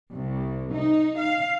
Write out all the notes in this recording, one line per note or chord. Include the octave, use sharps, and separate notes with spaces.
C2
D#4
F5